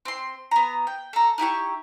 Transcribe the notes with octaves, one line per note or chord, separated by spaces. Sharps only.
C4 C6
B3 A#5
G5
A4 A#5
D#4 E4 G4 C#6